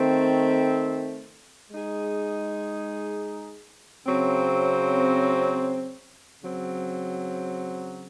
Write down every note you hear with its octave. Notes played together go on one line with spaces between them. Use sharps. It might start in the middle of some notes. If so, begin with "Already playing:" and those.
Already playing: D#3 A3 C4
G#3 D#4 G#4
C#3 F#3 C4
C#3 F#3 C4